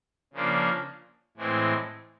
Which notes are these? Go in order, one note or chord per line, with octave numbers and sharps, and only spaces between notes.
C#3 F3 A#3 D4
A2 E3 G#3 C4